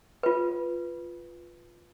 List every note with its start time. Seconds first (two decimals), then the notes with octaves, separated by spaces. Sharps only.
0.23 F4 B4